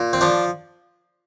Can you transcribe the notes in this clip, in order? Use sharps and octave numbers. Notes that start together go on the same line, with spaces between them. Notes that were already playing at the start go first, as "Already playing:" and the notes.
Already playing: A#2
C4
F3 D4